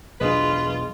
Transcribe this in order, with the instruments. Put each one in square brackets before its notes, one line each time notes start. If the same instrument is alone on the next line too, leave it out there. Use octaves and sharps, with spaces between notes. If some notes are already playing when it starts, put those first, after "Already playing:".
[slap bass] B1 E2 D4 [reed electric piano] F#3 G#4 D#5 [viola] F4 [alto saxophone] B4